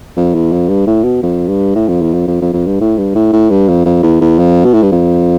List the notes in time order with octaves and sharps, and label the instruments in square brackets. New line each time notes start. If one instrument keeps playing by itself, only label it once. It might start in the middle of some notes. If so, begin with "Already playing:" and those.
[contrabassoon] F2
E2
F2
G2
A2
B2
F2
G2
A2
F2
E2
F2
F2
F2
F2
G2
A2
G2
A2
A2
G2
F2
F2
E2
E2
F2
B2
A2
G2
F2